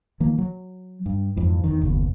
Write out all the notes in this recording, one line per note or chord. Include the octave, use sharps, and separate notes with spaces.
D#3 F3 A#3
F#3
G2
F2 G#2 E3
E2 D#3
F#1 D#2 B2